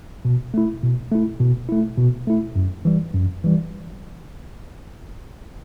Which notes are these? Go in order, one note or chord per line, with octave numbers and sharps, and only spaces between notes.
B2
A3 E4
B2
A3 E4
B2
A3 E4
B2
A3 E4
F#2
E3 G3
F#2
E3 G3